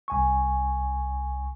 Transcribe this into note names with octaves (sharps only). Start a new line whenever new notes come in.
C2 G#5 C#6